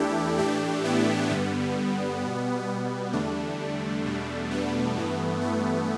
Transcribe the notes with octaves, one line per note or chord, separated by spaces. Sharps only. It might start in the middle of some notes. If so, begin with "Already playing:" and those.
Already playing: E2 E3 A3 D4 E4 G4 A4
A2 E3 A3 D4 G4
B3 E4
G2 D3 G3 B3
B2 G3
B3
E2 D3 G3 A3 D4
E2 B2 G3
B3
G2 E3 A3
A3